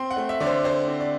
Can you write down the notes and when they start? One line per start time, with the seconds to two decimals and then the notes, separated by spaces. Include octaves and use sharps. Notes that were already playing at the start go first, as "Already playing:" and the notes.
Already playing: C4 C6
0.11 F#5
0.16 A3
0.29 E5
0.40 D3 D5
0.47 C5
0.64 D3 C5
0.88 C4
1.00 D5